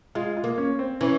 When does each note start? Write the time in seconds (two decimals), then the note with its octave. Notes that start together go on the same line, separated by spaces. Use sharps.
0.15 G#3 F4
0.37 F4
0.44 A#3
0.58 C#4
0.79 C4
1.01 E3 C#4